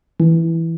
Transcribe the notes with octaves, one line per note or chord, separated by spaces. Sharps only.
E3